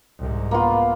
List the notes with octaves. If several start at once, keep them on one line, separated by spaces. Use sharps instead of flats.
C2 G#2
A#3 B3 F4